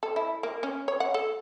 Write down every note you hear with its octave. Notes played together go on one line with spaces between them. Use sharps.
A4
E4
A#3
C#4
C#5
F#5
A4